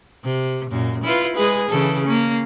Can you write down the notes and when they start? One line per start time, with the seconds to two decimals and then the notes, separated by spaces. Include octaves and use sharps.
0.24 C3
0.70 F#2 A#2
1.04 E4 F4 B4
1.35 G#3 G#4 B4
1.69 C#3 E3 A4
2.04 A#3 C#4